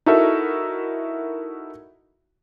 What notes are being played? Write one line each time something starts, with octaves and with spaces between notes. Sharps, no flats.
D#4 E4 F#4 A4 A#4 E5